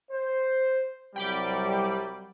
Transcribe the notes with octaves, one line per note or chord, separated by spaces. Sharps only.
C5
C2 F#3 G3 G5 B5 D6